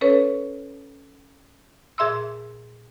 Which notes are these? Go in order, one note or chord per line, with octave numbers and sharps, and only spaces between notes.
C#4 A4 B4 C#5
A#2 G#4 E5 C6 E6